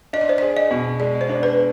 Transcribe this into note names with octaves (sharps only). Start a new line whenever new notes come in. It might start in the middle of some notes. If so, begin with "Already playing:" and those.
D4 D#5
D5
C5
G#4 D5
D#5
B2
G#3 D5
C5
D4
B4